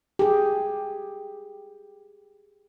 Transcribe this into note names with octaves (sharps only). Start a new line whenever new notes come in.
G4 G#4